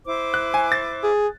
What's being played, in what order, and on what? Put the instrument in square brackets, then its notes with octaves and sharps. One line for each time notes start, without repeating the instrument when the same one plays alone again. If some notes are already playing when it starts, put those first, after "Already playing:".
[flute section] E4 C5 D6
[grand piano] F#6
G#5
A6
[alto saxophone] G#4